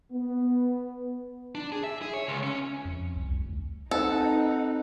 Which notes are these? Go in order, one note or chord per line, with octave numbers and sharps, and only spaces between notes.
B3
D4
G#4
E5
G#4
C#5
C#2
C#4
F2
C2
D2
C4 D#4 A4 B4 F#5